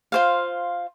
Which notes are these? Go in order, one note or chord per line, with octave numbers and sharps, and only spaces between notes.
F4 C5 F5